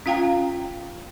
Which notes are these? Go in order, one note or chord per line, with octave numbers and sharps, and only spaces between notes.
C#4 F4 F5 G5 A#5